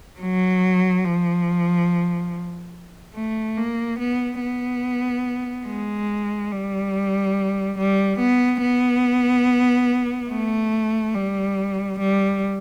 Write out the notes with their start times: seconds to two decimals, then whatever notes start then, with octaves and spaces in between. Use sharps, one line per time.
0.21 F#3
1.05 F3
3.15 A3
3.57 A#3
3.99 B3
4.42 B3
5.67 G#3
6.52 G3
7.78 G3
8.19 B3
8.62 B3
10.30 A3
11.15 G3
11.99 G3